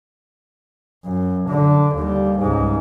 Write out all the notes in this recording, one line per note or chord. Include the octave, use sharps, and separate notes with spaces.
F#2
D3
D#2 G3
C#2 G#2